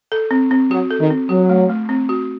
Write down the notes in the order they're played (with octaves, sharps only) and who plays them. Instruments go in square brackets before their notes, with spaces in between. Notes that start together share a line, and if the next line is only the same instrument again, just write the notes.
[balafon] A4
C4
C4
[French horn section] F#3 [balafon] F#4
[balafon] A4
[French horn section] D#3
[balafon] C4
[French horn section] F#3 [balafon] F#4
[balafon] A3
A3
C4
F#4